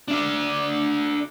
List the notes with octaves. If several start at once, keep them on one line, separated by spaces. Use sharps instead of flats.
D4 E5